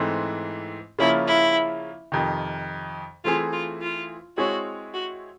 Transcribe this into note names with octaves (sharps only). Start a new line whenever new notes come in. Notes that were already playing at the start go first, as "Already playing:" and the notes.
Already playing: G#2 E3 A3 C4
C#3 F3 A#3 C#4 E4 F4
E4
F2 C3 D#3
E3 A3 C4 E4 F4 G#4
F4
F4
G#3 C4 E4 F#4 G#4 C#5
F#4